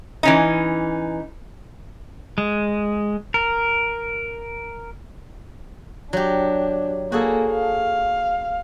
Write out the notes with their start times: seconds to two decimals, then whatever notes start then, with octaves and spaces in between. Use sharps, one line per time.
0.23 E3 C#4 D#4
2.38 G#3
3.34 A#4
6.13 F#3 D4 G4
7.12 A#3 F#4 G#4 A4
7.52 F5